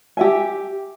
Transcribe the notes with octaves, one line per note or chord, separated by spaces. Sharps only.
G4 E5 G#5